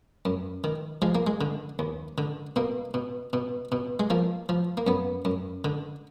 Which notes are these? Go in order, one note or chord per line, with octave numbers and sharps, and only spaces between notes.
F#2
D#3
F3 G#3
A#3
G#3
D3
D#2
D3
B2 A#3
B2
B2
B2
G#3
F3 A#3
F3
A#3
F#2 B3
F#2
D3